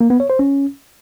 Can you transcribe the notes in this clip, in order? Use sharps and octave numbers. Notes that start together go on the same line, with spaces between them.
A#3
B3
C#5
C5
C#4